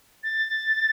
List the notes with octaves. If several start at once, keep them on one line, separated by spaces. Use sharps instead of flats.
A6